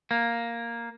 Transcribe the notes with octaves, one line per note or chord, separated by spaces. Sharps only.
A#3